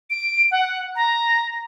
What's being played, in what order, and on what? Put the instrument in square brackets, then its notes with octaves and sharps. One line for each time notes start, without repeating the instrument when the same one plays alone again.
[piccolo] D7
F#5
A#5